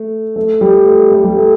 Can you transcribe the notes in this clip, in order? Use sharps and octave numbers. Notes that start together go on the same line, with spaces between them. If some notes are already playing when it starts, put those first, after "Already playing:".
Already playing: A3
A3
G3
A3
A3
G3
A3